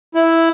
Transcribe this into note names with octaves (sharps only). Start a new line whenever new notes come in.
E4